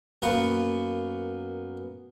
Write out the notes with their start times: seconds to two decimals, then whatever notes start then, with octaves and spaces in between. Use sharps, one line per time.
0.22 F#2 A#3 B3 A#4 B4 C#6